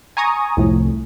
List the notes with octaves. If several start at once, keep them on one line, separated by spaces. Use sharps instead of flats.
G#5 A#5 C#6 D#6
C2 F2 A2